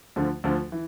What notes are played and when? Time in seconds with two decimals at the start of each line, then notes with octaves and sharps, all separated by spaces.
0.16 D2 D3 F3
0.44 D2 D3 F3
0.72 E3